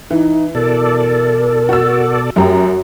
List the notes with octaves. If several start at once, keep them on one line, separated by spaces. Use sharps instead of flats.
E3 D#4
B2 A4 A#4 D5
F#4 E6
F#2 F#4 G4 A#5